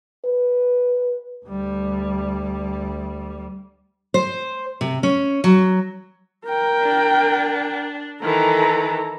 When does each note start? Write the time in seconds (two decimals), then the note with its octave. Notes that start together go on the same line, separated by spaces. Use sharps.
0.25 B4
1.45 D2 G3
4.14 C5
4.81 C3
5.03 C#4
5.44 F#3
6.46 A#4 G5
6.81 D4
8.23 D#3 E3 A4 A#5